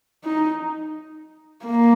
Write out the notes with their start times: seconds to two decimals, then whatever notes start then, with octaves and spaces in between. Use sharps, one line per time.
0.24 D#4
1.65 A#3